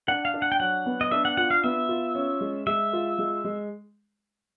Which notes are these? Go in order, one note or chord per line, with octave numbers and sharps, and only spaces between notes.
D4 F#5
F5
D4
F#5
G5
F#3 F#5
B3
D#5
D4 E5
F#5
F4 F#5
F5
B3 E5
F4
C#4
G#3
G#3 E5
F4
G#3
G#3